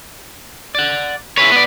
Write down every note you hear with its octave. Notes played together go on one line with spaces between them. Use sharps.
D5 F#5
E4 G#4 B4 C#5
B3 D5